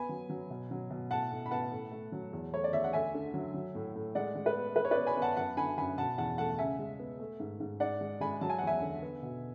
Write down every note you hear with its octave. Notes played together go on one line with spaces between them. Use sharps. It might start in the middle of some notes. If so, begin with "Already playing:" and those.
Already playing: B3 G#5 B5
F#3
F#3
B2
F#3
B2
A2 F#5 A5
A2
B5
B3 F#5 A5
A2
A3
F#3
E2
A3 C#5
D5
E2 E5
F#5
D2 E5 G#5
D3
F#3
F#3
A2
A2
G#3 D5 F#5
G#3
B4
B3
G#3 B4
C#5
B4 D5
B3
G#5 B5
B3
F#5 A5
F#2 F#5 A5
D3 G#5 B5
F#2 G#5 B5
B2 F#5 A5
E2 F#5 A5
A3 F#5 A5
C#3 E5 G#5
G#3
B3
A3
G#2
G#2
G#2 D5 F#5
G#3
G#3 G#5 B5
F#3 A5
G#5
E2 F#5
E5 G#5
D3
B3
B2